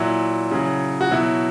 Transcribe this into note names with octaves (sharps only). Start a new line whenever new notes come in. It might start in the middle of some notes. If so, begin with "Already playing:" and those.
Already playing: A#2 F#3 E4
C#3 F#3
F#4
B2 F#3 E4